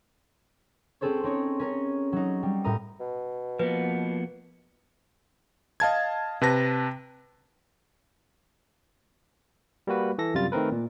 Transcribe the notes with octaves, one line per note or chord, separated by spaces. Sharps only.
C4 C#4 G#4 A4 C5 C#5
C4 D#4 C#5
C#4 A#4 C#5
F#3 D#4
G3
A2 A#4 A#5 D#6
B2
F3 A#3 B3 B4
D#5 F5 A5 G#6
C3 B4 A5 A#6
G3 A#3 F#4 B4
E3 A4 A#6
F#2 C3 G3 F4 A6
D#3 A3 C4 A#4 B4
A#2